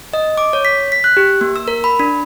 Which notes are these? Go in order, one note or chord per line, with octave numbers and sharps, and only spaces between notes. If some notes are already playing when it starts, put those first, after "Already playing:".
D#5
D6
C#5
B6
B6
F#6
G4
A#3
E6
A#4
B5
D4